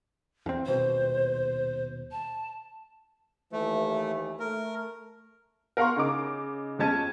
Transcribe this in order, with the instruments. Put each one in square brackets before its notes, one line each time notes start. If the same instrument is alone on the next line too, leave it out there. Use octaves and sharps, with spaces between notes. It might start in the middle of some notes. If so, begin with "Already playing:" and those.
[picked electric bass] E2 C4
[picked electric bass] D#1 B2 [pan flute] C5
[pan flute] A5
[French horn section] D#2 E3 [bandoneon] A3
[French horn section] A3 [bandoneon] A#4
[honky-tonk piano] A#4 F5 F#5 A#5 C6 C#6
C#3 D#4 D6
F2 G#3 C#4 A5 G#6 D#7